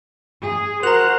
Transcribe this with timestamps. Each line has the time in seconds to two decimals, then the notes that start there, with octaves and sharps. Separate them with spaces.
0.42 G#4
0.83 F#4 A#4 C5 F#5 A#5 F7